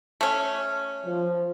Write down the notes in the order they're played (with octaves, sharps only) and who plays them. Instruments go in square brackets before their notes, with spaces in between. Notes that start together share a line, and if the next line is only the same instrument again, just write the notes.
[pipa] A3 C#4
[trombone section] F3